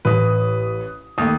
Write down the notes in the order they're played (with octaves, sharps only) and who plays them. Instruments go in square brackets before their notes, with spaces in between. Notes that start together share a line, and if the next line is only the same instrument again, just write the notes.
[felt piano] A1 D#6 [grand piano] B4
[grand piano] D#2 [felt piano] A3 D#6